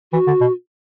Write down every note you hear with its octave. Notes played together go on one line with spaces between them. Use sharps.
E3 F#4
D3
B2